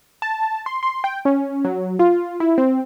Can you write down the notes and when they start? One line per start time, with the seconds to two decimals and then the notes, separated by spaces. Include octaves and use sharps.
0.22 A5
0.66 C6
0.83 C6
1.04 G5
1.25 C#4
1.65 F#3
1.99 F4
2.40 E4
2.58 C4